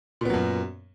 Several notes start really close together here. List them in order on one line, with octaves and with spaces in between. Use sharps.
A#2 B3 F#3 F#2